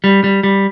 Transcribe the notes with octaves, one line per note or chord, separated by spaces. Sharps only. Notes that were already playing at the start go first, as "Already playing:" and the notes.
G3
G3
G3